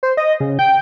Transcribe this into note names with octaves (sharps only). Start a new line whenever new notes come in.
C5
D#5
C#3
G5